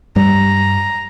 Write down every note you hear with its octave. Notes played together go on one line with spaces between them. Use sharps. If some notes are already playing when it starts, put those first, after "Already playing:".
G2 G3 A#5